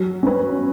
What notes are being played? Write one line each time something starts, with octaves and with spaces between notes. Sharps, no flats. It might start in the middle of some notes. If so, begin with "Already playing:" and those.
Already playing: F#3
C#4 B4